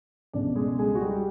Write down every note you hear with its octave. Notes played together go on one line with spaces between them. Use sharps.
C#2 B2 D4 D5
G#3 G#4
G#3 G#4
F#4
G3 G4